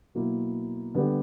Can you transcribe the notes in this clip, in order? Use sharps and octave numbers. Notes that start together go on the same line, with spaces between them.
B2 F#3 A#3 E4 A#4
D3 G3 B3 D4 G4